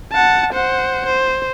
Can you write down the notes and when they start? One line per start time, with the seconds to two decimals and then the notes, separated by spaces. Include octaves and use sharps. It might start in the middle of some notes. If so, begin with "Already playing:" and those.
0.12 F#5 A5
0.53 C5 F#5
1.06 C5